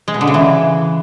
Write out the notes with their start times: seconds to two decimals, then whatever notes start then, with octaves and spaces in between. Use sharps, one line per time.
0.08 G#3
0.14 B2
0.21 D3
0.27 C#3
0.34 E3